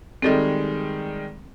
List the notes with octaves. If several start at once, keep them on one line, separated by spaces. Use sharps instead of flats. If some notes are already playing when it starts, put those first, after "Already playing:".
D#3 G3 G#3 C4 A4 D#5